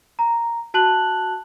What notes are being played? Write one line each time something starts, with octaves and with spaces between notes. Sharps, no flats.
A#5
F#4 A5 F#6 F#7